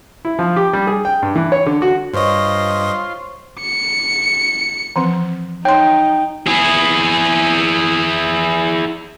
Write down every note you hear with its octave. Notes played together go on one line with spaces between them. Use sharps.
E4
F3
G4
G3
G#4
G5
G2
E3
C#5
D3
F#4
G2 F4 C5 C#5 D#5 C6 C#6
C#7
E3 F3 C4
D#4 C#5 G5 C6
E4 G#4